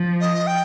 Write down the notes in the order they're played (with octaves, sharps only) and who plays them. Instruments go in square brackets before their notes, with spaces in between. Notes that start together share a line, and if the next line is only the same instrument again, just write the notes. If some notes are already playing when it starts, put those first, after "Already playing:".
Already playing: [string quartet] F3
[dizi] D#5
G5